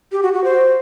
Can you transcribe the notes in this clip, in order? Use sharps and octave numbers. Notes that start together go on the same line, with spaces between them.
G4
F#4
F#4
C5